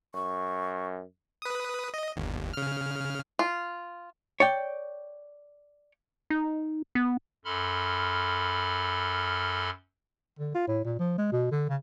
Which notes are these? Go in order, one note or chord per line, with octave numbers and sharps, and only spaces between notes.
F#2 C#6
B4 D#6
D#5
G1 D#2
C#3 F6
F4
C#5 D5 G5
D#4
B3
F#2 A4 B5 C6 F6
D3
F4
A2
A#2
F3
G#3
B2
D3
C#3